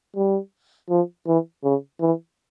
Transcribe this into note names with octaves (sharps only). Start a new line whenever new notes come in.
G3
F3
E3
C#3
E3